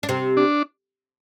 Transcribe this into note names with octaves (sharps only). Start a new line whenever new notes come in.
D4
C3 C4
D4